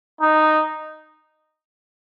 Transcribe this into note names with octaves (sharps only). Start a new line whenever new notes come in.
D#4